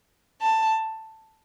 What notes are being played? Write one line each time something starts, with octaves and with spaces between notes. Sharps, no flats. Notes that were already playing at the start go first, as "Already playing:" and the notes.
A5